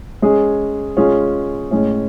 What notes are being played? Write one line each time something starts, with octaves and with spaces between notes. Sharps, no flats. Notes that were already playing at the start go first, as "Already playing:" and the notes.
G#3 C#4 G#4
G#3 C#4 F4 G#4
A2 G#3 C#4